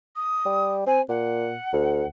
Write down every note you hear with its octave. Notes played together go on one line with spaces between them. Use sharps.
D#6
G3
C4 G#5
A#2 F#5
D2